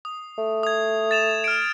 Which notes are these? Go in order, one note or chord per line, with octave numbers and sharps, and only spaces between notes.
D#6
A3
D#6 G#6
A6 E7 F7
F6 D7